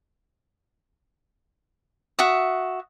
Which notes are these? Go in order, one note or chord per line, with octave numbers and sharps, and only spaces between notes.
F#4 E5 D#6